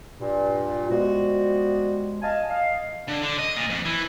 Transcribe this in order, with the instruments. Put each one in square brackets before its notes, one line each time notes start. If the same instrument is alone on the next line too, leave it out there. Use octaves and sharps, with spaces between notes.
[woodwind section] G2 A#2
F3 G3 G#3 B3 F#4
D#5 F5 G#5 A5
D#5 F5
[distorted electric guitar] D3
D3
D#5
A#2
F2
E3